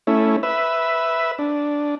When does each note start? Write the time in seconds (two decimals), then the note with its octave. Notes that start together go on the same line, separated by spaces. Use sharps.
0.07 A3 C#4 E4
0.43 B4 E5
1.38 D4